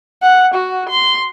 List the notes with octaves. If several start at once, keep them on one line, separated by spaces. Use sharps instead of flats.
F#5
F#4
C6